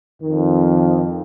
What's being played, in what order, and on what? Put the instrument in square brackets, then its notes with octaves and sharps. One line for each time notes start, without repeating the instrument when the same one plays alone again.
[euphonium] F2 [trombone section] D#3